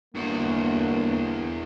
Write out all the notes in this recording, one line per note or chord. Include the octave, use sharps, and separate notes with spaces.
G1 E2 A#3 F#4